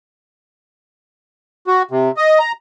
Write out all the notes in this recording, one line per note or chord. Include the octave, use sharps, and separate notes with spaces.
F#4
C3
D#5
A#5